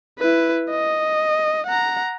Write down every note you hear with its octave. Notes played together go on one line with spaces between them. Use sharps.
E4 B4
D#5
F#5 A#5